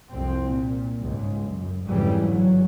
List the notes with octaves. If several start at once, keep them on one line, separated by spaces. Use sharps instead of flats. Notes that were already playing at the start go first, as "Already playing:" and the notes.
C2 F2 C4
A#2
G1 C#2 G#2
F#2
F2 G#2 C#3 E3 G3
G1 F#3